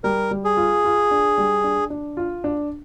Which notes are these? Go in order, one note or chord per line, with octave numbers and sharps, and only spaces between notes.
G3 A#4
G3
G#4
F4
F4
D4
G3
D4
D4
F4
D4